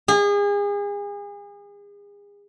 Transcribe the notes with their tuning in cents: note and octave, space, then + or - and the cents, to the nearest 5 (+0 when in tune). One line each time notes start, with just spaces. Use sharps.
G#4 -35